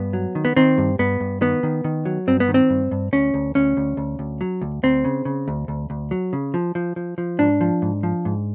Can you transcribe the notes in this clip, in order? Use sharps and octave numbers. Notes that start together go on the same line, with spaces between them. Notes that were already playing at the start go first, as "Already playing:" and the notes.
Already playing: G2 B3
F#3
D#3
B3
D#3 C4
G2
G2 B3
G2
D#3 B3
D#3
D#3
F#3
G2 C4
B3
D#3
C4
G2
G2
D2 C#4
D2
D2 C#4
D2
D2
D2
F#3
D2
D2 C4
C#3
C#3
D2
D2
D2
F#3
C#3
F3
F3
F3
F3
G#2 D4
F3
G#2
F3
G#2